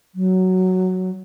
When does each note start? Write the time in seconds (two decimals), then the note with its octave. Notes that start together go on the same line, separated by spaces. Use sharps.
0.15 F#3